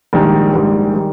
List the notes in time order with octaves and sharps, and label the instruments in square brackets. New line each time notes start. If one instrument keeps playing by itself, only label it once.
[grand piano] A#1 G#2 D#3 G3
A#1 G#2 D#3 G3
D#3 G3